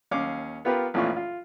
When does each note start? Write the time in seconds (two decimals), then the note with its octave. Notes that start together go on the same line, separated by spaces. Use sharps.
0.11 D#2 C#4 F5 D6
0.65 B3 F4 G4 A#4 B4
0.94 A1 F2 A#2 E3 F4 C#6
1.16 F4